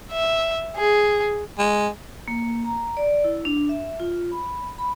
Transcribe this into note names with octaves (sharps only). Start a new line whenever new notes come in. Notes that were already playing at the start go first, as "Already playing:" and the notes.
E5
G#4
G#3
A#3
A#5
D5
E4
D4
E5
F4
B5
B5